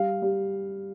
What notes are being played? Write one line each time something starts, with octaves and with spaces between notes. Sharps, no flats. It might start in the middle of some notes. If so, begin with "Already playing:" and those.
Already playing: G3 F5
G3